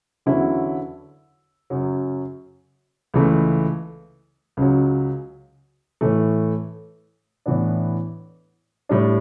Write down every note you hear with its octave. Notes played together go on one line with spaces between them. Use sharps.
E2 D3 F#3 C#4 E4
F#2 C#3 F#3
C#2 C#3 E3 A3
C#2 C#3 F#3
A2 E3 A3
A2 E3 B3 D4
A2 G3 D4